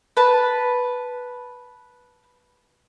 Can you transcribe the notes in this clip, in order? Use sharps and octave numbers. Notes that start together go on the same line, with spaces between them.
B4 A5